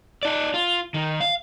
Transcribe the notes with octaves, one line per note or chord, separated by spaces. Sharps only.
D#4 D5
F4
D#3
F5